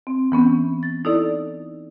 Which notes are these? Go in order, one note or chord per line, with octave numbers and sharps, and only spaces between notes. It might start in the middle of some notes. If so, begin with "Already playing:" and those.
C4
E3 B3 C#4
A6
D#4 E4 A4 D5